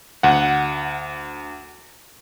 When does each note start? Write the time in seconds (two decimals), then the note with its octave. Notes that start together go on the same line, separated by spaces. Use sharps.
0.23 D2 F#5